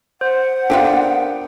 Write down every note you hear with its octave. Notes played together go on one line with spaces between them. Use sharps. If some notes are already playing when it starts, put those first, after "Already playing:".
C5 F#5
B3 D4 F4 G4 A4 A#4